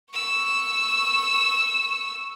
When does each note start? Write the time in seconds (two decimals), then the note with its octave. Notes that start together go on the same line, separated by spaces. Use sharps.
0.13 C#6 E6